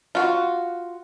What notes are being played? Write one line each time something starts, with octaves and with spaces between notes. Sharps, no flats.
F4 F#4